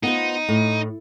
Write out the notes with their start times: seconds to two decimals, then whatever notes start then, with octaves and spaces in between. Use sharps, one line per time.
0.03 B3 D#4 F4 C5
0.49 A2